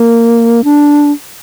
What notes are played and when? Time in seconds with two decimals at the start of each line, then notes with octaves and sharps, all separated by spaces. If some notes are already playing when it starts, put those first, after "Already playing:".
Already playing: A#3
0.64 D4